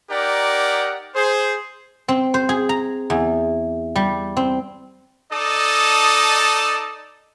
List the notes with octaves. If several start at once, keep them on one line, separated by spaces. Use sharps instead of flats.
D#4 G4 A#4 D5 F#5
G#4 C5
C4
C5
G#4
A#5
E2
G3
C4
D#4 A4 D5 D#5 A5 D#6